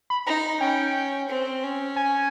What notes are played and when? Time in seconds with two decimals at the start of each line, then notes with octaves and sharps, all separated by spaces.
0.10 B5
0.27 D#4 A#5
0.61 C#4 G5
1.29 C4
1.63 C#4
1.96 G#5